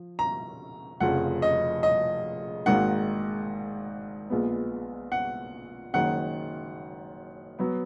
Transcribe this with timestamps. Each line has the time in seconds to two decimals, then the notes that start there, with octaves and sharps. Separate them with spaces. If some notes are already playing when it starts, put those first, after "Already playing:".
Already playing: F3
0.19 A#5
1.00 F1 F2 C#3 F3 F#5
1.42 D#5
1.83 D#5
2.66 G#1 G#2 D#3 A#3 F#5
4.30 A#1 A#2 G#3 B3
5.12 F#5
5.94 F#1 F#2 D#3 G#3 F#5
7.59 F#3 B3